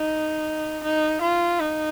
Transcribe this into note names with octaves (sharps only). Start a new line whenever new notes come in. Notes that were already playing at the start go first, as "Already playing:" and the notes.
Already playing: D#4
D#4
F4
D#4